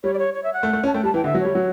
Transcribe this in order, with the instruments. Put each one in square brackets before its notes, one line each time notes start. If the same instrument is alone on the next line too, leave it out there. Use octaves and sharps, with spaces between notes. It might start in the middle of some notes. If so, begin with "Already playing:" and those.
[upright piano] G3 [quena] C#5
[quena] D5
C#5
C#5
E5
F#5
[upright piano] A3
A3
[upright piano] C#4 [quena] A5
[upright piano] A3 [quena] G5
[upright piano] G3 [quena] A5
[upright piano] E3 [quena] G5
[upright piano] D3 [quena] E5
[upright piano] F#3
[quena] C#5
[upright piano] G3
F#3